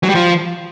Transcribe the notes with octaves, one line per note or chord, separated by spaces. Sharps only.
F#3
G3
F3